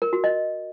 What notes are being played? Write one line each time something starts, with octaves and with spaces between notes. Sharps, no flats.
A#4
F#4
D#5